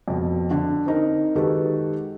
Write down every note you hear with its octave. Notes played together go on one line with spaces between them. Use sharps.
F2 B2
D3
C4 D#4 A#4
D#3 G#3 F#4 G4 A4 B4